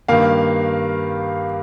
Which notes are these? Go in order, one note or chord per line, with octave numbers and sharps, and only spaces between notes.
G2 D#3 A#3 F5